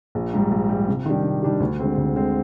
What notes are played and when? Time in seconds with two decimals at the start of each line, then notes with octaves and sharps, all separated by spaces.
0.15 A#1
0.34 G#2 G3
0.51 A#1
0.69 G#2 G3
0.88 C3
1.06 D#3 G3 D4 G4
1.24 C3
1.43 D#3 G3 D4 G4
1.60 D2
1.79 D3 G#3 C4
1.97 D2
2.15 D3 G#3 C4